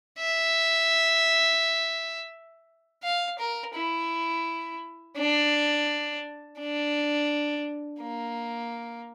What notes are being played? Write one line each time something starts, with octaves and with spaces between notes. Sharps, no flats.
E5
F5
A#4
E4
D4
D4
A#3